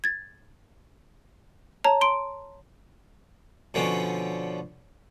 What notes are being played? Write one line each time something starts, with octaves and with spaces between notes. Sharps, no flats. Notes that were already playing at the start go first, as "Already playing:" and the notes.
G#6 A6
C#5 A5 A#5
C6 D7
B2 D3 F3 C#4